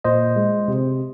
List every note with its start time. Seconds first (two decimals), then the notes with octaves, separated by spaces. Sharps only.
0.04 A#2 C5 D#5
0.36 G#3
0.68 C3